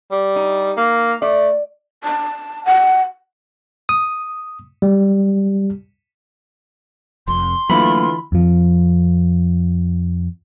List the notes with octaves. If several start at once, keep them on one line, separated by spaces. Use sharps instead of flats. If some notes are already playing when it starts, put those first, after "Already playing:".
G3
D#4
A#3
A3 D5
A5
F#5
D#6
G3
F1 F2 C6
D3 E3 F#3 A3 A#3 F4 B5
F2 F3